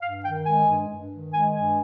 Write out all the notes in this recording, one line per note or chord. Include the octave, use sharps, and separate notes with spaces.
G2 F5
D#3 G5
G#3 G#5
G2
G2
D#3
G#3 G#5
G2 G#5